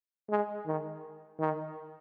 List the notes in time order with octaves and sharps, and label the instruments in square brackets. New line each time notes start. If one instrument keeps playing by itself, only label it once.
[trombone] G#3
D#3
D#3